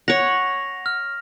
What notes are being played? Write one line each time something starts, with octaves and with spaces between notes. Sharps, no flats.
C#5 F#5 A#6 F7
F6